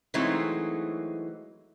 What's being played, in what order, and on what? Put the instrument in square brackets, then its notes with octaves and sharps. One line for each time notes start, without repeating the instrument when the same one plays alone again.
[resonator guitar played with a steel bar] E3 F#3 G#3 A3 C4 D#4